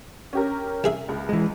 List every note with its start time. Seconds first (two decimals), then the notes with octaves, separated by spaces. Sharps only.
0.33 C#4 G4 A#4
0.84 C2 G#4 E5
1.08 C#2
1.29 E3 G#3